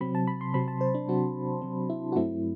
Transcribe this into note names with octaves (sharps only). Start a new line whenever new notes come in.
C3 F#3 C4 B5
A5
B5
C6
C3 F#3 C4 B5
A5
C5
D4
C3 F#3 C4 F#4
C3 F#3 C4
E4
F#4
G2 F#3 A3 C4 E4